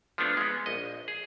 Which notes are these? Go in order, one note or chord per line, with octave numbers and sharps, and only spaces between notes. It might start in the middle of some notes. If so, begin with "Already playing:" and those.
F3 A3 B3 D4 F4
G#3 B3
A#1 D#5
G#4